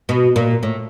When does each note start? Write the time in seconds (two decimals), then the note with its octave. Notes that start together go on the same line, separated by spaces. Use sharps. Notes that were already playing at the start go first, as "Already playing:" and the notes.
0.09 B2
0.36 A#2
0.63 A2